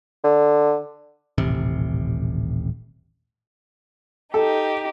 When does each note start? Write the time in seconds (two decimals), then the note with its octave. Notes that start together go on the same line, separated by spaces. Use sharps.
0.24 D3
1.38 D#1 A1 C3
4.34 D#4 G4 A4